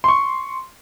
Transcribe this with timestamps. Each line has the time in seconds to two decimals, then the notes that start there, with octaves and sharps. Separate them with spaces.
0.04 C6 C#6